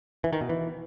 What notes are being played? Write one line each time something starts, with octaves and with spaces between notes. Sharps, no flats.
E3
D#3
B2
E3